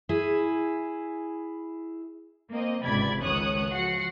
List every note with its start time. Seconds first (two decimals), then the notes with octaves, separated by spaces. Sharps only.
0.09 E4 G#4
2.51 A#3 C4 D#5
2.84 G#1 C#2 C3 D5 B5 G#6
3.22 C#2 D#3 C#5 D#6 F#6
3.71 F3 F#4 F#5 C7 C#7